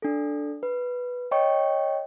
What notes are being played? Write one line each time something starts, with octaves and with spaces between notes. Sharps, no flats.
D4 A4
B4
C#5 D#5 G5 C#6